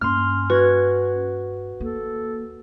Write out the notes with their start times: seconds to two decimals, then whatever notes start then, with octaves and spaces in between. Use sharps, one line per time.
0.01 G2 A#3 C#4 C6 F6
0.50 F#4 B4 G#6
1.80 D#2 A#3 A4